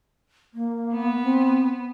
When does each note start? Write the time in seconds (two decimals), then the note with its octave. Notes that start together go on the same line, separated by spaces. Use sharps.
0.54 A#3
0.92 B3
1.23 C4